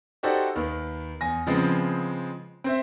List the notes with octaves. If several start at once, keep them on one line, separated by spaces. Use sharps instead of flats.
D#4 F#4 G4 A4 C5 D5
D#2 D#3 B4
E2 G#5 A#6
C#3 F3 G#3 B3 C4
C4 C5 E5